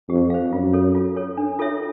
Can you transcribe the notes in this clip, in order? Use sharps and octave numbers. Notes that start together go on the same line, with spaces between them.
F2 G4
C5 F5
F#2 F4
A4 C#5
F4
A4 C#5
D4
F4 A4 C#5 E5